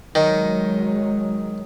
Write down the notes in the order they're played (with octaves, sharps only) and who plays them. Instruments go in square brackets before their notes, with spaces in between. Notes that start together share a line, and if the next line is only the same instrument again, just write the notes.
[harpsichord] D#3 [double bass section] F#3 G#3 [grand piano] D#4